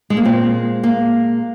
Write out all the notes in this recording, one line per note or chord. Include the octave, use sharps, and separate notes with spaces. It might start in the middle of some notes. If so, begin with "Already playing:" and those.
G#3
A#3
A#2 G#3 C4
A#3